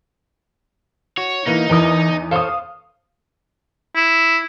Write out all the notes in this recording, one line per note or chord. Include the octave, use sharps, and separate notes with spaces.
F#4 C#5
E3 A#3 B3 D#4
E2 E3 A#4 B4 D#6
A4 C5 C#5 F5 D#6
E4